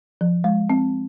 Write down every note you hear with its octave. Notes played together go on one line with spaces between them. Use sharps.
F3
G#3
C4